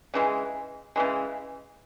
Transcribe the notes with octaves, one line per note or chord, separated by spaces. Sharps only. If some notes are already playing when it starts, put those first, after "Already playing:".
C#3 E3 G#3
C#3 E3 G#3